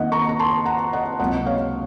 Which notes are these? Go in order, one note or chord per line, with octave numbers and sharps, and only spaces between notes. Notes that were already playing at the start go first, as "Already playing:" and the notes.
Already playing: F2 D#3 A#3 D#5 F#5
A#5 C#6
A#5
A5 C6
F#5 A#5
D#5 F#5
C#2 C3 F#3 A#3 D#5 F#5
C#5 F5